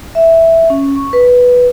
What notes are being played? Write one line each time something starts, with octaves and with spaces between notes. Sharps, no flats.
E5
C#4
C#6
B4
B4